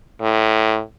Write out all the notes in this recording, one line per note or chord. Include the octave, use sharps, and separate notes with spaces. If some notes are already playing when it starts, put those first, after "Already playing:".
A2